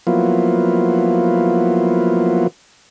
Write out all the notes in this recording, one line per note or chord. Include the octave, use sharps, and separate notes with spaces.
F3 F#3 A#3 B3 E4 F4